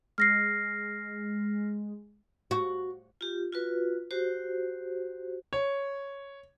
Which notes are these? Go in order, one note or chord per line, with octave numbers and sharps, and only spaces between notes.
G#3 F6 A#6 C7
F#4
F4 G4
F4 F#4 B4
F#4 G4 C5
C#5